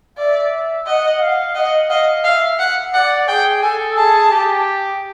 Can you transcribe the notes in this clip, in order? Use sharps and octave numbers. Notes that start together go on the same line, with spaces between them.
D5 E5
D#5 F#5
F5
D#5 F#5
D#5 F5
E5 F5
F#5
D5 F#5
G#4 G5
A4 G#5
G#4 A5
G4